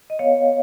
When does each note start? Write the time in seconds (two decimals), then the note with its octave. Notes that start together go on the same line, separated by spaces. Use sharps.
0.10 D#5
0.19 B3 C#5 F5